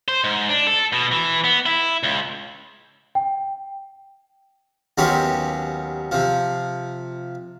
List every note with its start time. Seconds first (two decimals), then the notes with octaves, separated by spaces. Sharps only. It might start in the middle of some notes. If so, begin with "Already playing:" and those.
0.08 C5
0.24 G#2
0.49 D4
0.67 A4
0.93 B2
1.12 E3
1.44 B3
1.66 E4
2.03 C#2
3.15 G5
4.98 D#2 F#3 B3 C#4 G4 C6
6.12 C3 F3